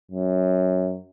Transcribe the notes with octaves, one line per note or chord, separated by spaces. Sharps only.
F#2